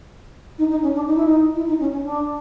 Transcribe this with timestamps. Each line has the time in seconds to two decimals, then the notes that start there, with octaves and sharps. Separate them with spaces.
0.58 D#4
0.70 D#4
0.82 C#4
0.94 D4
1.07 D#4
1.15 E4
1.25 D#4
1.56 E4
1.68 D#4
1.79 C#4
1.92 C#4
2.04 D4